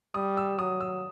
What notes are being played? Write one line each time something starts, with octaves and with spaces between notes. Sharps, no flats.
G3 D#6
E6
F#3 D#6
E6